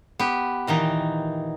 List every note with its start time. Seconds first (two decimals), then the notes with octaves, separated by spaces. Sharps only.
0.19 B3 G4
0.67 A#2 D#3 E3 D#4